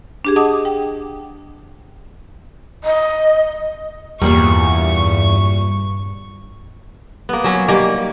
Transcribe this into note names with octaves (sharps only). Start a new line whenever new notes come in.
D4 G4 G#4
D#5 F#5 A5 D6 D#6
G5
D#5
E2 G2 A#2 G3 C#6
A#3 B3
F#3 C#4
D#3 G3 A#3